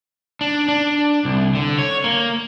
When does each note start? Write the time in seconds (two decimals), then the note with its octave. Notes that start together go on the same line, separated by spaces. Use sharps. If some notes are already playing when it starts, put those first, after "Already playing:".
0.41 D4
0.68 D4
1.25 C2
1.55 D3
1.79 C#5
2.04 A#3